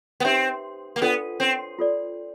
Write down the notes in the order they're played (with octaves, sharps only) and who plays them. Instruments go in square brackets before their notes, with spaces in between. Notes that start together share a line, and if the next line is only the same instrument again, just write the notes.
[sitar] B3
[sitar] C4 [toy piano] D#4 G4 B4 E5 G5
[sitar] A#3
[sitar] B3 [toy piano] D4 F4 A4 D5 F#5
[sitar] C4
[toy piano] F4 A4 D5